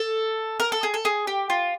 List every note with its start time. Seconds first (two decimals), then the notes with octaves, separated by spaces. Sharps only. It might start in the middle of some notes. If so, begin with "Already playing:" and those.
Already playing: A4
0.60 A#4
0.72 A4
0.83 G#4
0.94 A4
1.05 G#4
1.27 G4
1.50 F4